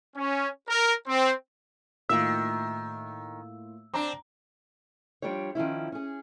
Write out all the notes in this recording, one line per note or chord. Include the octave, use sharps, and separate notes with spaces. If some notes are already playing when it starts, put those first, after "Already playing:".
C#4
A#4
C4
A2 D#3 A#3 F4 E5 E6
C4 D4 A#5 D6
F3 G3 D4 G4 C#5
D#3 F3 C#4 E4
C#4 G#4